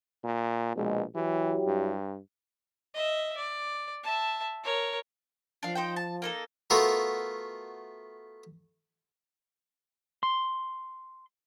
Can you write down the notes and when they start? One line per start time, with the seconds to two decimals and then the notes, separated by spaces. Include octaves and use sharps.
0.24 A#2
0.76 A#1 B2 G#3
1.15 E3 F#3 E4 G4
1.66 G2
2.94 D#5 E5
3.37 D5
4.03 E5 A5
4.63 A#4 C#5
5.63 F3 D4 F5
5.75 D#4 C5 G5
5.96 A5
6.22 A#3 D#4 A4
6.70 A3 B3 F4 F#4 A4 A#4
10.23 C6